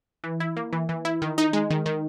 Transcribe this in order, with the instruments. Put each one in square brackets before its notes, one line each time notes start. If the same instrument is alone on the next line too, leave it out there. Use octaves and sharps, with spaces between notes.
[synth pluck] E3
E4
A#3
E3
E3
E4
D#3
D#4
G#3
D#3
D#3